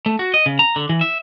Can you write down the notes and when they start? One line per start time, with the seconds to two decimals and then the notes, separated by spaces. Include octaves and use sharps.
0.06 A3
0.19 F#4
0.34 D#5
0.46 C#3
0.59 A#5
0.76 D3
0.89 E3
1.01 E5